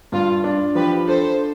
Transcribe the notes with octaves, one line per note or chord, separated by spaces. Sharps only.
G2 F4
D4
F3 G4 B4
D4 A4 C5